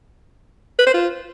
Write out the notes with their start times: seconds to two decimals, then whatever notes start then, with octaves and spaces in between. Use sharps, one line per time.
0.79 B4
0.87 C5
0.94 F4